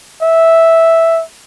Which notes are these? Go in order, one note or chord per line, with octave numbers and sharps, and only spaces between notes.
E5